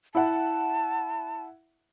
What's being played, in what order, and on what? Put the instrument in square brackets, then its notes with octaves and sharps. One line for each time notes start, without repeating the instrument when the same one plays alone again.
[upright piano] E4 E5 F#5 [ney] A5